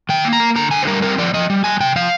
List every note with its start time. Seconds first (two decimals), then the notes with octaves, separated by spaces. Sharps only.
0.09 D#3 G5
0.25 A#3
0.33 A#5
0.40 A#3
0.56 D3 A#5
0.71 D3 G#5
0.83 C5
0.87 G3 A#4
1.02 C4 A#4
1.18 F3 D5
1.34 F3 D#5
1.50 G3
1.64 G3 G#5
1.80 C3 G5
1.96 F3 F5